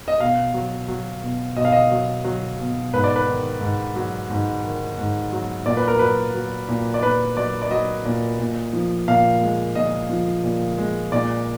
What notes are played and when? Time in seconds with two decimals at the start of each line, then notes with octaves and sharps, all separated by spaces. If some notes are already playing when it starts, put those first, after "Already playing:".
0.08 D#5
0.20 B2 F5
0.54 F#3
0.88 F#3
1.22 B2
1.56 B2 D#5
1.65 F5
1.72 D#5
1.91 F#3
2.24 F#3
2.59 B2
2.93 G#2 B4
3.04 D5
3.16 B4
3.27 D#3
3.61 G#2
3.96 F#3
4.30 G#2
4.64 D#3
4.98 G#2
5.32 F#3
5.66 A#2 D5
5.77 B4
5.88 A#4
5.99 F#3 B4
6.34 F#3
6.68 A#2
6.94 D5
7.03 A#2 B4
7.37 F#3 D5
7.62 D5
7.71 F#3 D#5
8.05 A#2
8.39 A#2
8.73 F3
9.08 A#2 F5
9.41 G#3
9.75 A#2 D#5
10.09 F3
10.43 A#2
10.78 G#3
11.12 A#2 D5